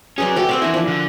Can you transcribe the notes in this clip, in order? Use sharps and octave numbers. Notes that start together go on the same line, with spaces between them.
F#3 C#4 G#4 B4 D5
A3 F#4 G4 D5
C4 C5 E5 G#5
E2 D4 E4 A#4
F3 D4
D3